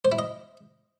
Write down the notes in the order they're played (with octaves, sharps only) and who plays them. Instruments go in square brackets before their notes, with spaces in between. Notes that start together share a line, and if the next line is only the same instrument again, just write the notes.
[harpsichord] C5
E4
D#5